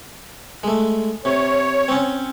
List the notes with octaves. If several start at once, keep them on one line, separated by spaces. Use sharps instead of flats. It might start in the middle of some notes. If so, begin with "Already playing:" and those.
G#3 A3
C3 C#5
C4 C#4